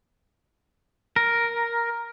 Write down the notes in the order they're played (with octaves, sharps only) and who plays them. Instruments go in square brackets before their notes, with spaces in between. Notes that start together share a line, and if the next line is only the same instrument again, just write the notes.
[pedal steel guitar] A#4